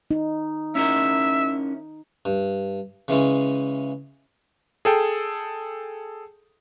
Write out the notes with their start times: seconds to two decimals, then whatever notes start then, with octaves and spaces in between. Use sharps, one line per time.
0.11 D#4
0.75 C#4 E4 A#4 E5
2.25 G2
3.08 C#3 E3 G#3 C#4
4.85 G#4 A4 G5